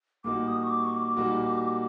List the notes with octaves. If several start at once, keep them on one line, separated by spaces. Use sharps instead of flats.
A#2 G3 A#3 D#4 F#4 D6
D#6
C#6
D6
C#6
D6
A#2 G3 A#3 D#4 F#4